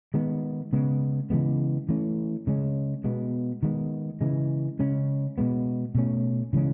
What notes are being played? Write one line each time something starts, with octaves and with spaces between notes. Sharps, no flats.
D#3 G#3 B3
C#3 G#3 B3
C#3 E3 G#3 B3
E3 A3 C#4
C#3 G#3 C#4
B2 G#3 B3
D#3 G#3 B3
C#3 E3 G#3
C#3 G#3 C#4
B2 G#3 B3
B2 A3 C#4
C#3 E3 G#3 C#4